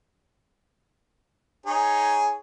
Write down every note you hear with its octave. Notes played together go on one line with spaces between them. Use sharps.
D#4 G#4 C#5